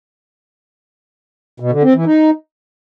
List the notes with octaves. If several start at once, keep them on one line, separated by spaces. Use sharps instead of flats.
B2
D3
C4
E3
D#4